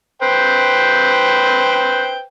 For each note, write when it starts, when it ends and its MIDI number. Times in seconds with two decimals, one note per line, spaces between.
0.22 2.22 71
0.22 2.22 72
0.22 2.22 79